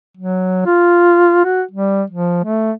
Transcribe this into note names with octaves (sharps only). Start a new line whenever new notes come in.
F#3
F4
F#4
G3
F3
A3